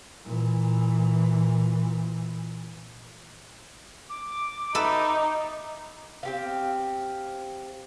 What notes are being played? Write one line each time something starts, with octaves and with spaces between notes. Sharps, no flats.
A#2 E3
D6
D#4 A4 B4 E5
C4 G4 F5